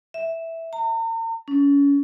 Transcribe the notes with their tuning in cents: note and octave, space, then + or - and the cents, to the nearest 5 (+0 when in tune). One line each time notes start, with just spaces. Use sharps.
E5 -5
A#5 -45
C#4 +30